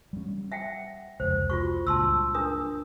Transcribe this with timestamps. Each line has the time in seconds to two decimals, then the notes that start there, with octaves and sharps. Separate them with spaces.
0.13 G3 C#4
0.52 E5 F#5 G5
1.20 F1 C#2 C5
1.50 F4 F#4 C#6
1.87 C#2 G2 A#2 A5 C6 E6
2.34 D4 A#4 D#6